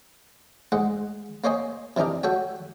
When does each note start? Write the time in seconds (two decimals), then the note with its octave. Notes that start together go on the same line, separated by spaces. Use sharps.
0.72 G#2 G#3 F#5
1.44 A#3 C5 C#5 D#5 G#5
1.97 C3 E3 D4 D#4 A#4
2.23 F#4 A4 C#5 G5